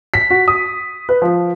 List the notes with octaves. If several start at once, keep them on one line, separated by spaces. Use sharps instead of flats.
B6
F#4
D#6
B4
F3